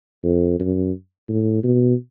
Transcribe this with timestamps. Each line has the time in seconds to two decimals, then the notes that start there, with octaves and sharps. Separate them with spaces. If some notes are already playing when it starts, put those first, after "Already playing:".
0.24 F2
0.60 F#2
1.29 A2
1.64 B2